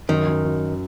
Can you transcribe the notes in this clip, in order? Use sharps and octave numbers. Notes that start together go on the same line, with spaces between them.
F#2 D#3
F#2
F#2